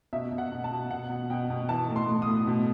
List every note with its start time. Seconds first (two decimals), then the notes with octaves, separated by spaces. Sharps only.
0.13 B2 E5
0.32 B2
0.38 F#5
0.52 B2
0.64 A5
0.71 B2
0.91 B2 F#5
1.10 B2
1.30 B2 G5
1.50 B2
1.69 E3 A5
1.89 A2
1.96 C6
2.09 A2
2.22 D#6
2.28 A2
2.47 B2